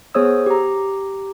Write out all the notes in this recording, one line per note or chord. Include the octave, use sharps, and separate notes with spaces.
B3 G#4 C5 C#5 D#6 E6
G4 A#5